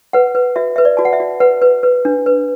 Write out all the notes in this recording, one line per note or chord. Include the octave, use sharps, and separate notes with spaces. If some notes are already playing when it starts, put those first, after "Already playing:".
B4 F#5
B4
F#4 E5
B4 E5
D5
F#4 A5
F#5
E5
F#4
B4 F#5
B4
B4
D4
B4